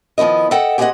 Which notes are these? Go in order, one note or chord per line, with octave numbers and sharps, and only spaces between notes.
D#3 F3 B3 E4 D#5
A4 D#5 E5 F#5 G5
G4 G#4 C5 C#5 D#5 F#5